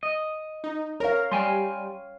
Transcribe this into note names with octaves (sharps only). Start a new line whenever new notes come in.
D#5
D#4
A#4 C#5 F5
G3 G5 G#5 C6